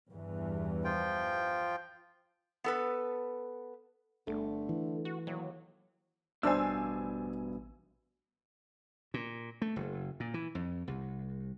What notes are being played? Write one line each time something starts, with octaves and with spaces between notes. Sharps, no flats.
E2 G2 E3
F3 F4 G5
B3 A4 B4
G1 D3 A3
E3
F#4
D#2 F#3
A1 G2 B2 D4 C5 G#5 E6
A#2
A3
F#1
A#2
E3
F2
C2